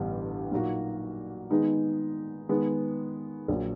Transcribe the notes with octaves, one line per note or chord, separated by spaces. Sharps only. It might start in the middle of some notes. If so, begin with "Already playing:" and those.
Already playing: A1 G2 D3 G3 B3
A#2 F#3 A#3 D#4 F#4
D#3 G#3 B3 D#4
D#3 G#3 B3
A#1 A#2 F#3